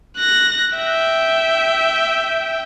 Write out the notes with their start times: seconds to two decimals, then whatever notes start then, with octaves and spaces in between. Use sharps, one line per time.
0.17 F#6 A#6
0.77 E5 G5